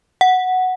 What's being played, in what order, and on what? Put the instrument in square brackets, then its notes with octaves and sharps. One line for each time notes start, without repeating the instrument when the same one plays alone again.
[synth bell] F#5